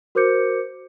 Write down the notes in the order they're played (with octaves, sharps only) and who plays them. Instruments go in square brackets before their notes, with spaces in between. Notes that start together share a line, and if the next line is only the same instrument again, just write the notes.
[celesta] F#4 A#4 C5 D6 G6 C#7